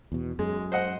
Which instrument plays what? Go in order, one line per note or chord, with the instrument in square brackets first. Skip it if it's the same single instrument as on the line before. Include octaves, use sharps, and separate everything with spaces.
[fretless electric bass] E2 B2
[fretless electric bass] F#2 [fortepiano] G#3
[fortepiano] C5 D#5 F#5